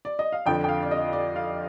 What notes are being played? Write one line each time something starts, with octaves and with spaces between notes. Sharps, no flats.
D5
D#5
F5
F2 D3 F3 G5
G5
F5
D5
D#5
D5
F5